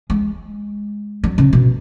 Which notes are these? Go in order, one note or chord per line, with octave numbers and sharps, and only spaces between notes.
G#3
F#3
C#3
B2